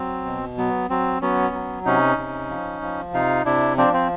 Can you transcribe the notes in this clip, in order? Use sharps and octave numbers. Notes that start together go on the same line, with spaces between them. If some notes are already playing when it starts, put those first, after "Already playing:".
Already playing: F#3 C4
B2
F#3 B3
F#3 C4
F#3 B3 C#4
F#3
C3 C#4 D#4
C3
F3
F3
C3 D#4 F4
C3 D4 E4
F3 C4 D4
C4